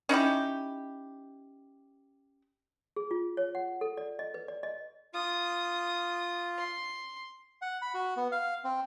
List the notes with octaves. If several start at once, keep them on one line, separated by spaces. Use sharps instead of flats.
C#4 D#4 E4 G4
G#4
F4
C#5
F#5
A4
D5
D#5
B4
D5
D#5
F4 D#6
C6
F#5
B5
F#4
B3
F5
C4